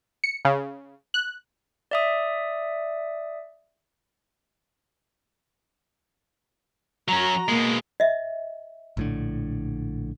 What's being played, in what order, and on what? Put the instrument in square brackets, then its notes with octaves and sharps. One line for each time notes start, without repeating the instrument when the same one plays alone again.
[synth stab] C#7
C#3
F#6
[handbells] D5 E5 D#6
[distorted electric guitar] F#3 C#4 [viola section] F#4 A#5
[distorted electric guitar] B2 G#3 [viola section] A#3
[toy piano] D#5 E5
[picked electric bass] A#1 A2 D3